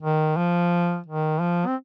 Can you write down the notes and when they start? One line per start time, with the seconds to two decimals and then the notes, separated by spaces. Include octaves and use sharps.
0.02 D#3
0.37 F3
1.06 D#3
1.41 F3
1.67 C4